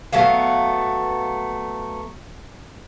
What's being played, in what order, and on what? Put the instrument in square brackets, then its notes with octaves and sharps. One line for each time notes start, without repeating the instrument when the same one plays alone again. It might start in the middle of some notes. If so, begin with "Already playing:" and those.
[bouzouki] F#3 A3 B3 F5